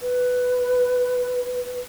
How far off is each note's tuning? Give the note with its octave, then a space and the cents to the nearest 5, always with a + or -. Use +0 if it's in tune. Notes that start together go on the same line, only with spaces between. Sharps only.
B4 +5